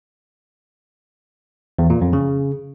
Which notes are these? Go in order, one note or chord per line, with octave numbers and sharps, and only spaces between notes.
E2
A#2
F2
C#3